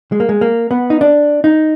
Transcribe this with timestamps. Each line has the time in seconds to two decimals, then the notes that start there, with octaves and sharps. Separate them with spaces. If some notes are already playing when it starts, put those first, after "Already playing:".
0.12 G#3
0.20 A#3
0.29 G#3
0.41 A#3
0.71 B3
0.90 D#4
1.01 D4
1.44 D#4